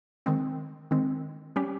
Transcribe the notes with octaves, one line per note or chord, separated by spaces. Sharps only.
D#3 G#3 C4
D#3 G#3 C4
G3 C#4 G4